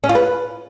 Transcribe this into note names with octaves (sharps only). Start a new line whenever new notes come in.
C#4
F4
B4